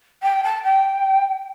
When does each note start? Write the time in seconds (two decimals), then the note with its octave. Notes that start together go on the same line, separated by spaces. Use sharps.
0.23 G5
0.43 A5
0.63 G5